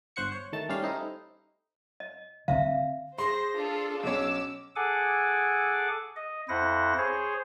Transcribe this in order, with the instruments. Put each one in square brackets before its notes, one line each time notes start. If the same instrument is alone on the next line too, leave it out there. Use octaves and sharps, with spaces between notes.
[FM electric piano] G1 C5 F#5 C#6 C#7
C#5
D#3 A3 A5
G3 C#4 G4 F5
A3 C4 D#4 E4
[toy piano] D#5
[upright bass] D3 C4 [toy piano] E5 F5
[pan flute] G#4 [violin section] C5 A#6 [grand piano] C6
[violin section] D4 F4 A4
[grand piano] B1 C#4 [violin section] D6 E6
[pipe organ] G#4 A4 F#5 G#5 D6
D#5
F2 E4 C5 F#5 A#6
G#4 C5 C#5